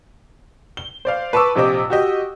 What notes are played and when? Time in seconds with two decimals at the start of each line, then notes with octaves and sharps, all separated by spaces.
0.77 G7
1.05 C5 D5 F5
1.33 B4 A5 C#6 D6 E6
1.56 A#1 C3 C4 D#5 D6
1.90 F#4 G4 D#5